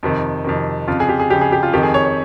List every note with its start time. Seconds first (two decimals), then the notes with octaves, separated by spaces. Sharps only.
0.03 F2 C3 D#3
0.44 F2 C3 D#3
0.87 F2 C#3 F4
1.00 G#4
1.09 G4
1.20 G#4
1.30 F2 C#3 G4
1.41 G#4
1.52 G4
1.63 F4
1.73 F2 D#3 G4
1.83 G#4
1.94 C#5
2.05 C#5